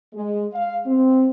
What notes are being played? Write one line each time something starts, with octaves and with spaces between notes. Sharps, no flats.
G#3
F5
C4